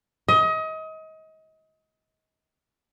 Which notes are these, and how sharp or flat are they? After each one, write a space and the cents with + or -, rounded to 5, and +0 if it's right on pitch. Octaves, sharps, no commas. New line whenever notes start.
D#5 +30